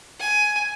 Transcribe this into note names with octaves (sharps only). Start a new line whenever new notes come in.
G#5